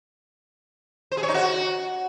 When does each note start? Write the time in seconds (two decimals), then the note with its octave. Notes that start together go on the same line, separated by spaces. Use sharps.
1.12 C5
1.17 G#4
1.23 C#5
1.29 D#4
1.34 F#4